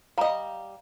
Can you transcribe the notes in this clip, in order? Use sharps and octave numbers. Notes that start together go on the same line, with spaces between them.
G3 D#5 F5 A#5